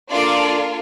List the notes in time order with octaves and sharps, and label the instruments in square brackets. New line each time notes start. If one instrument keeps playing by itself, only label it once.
[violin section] A#3 D4 F4 A4 D5